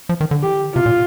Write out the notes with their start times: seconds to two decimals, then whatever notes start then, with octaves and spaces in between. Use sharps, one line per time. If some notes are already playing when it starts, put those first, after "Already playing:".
0.09 F3
0.21 D#3
0.31 D3
0.42 G4
0.75 C3 F4
0.86 A#2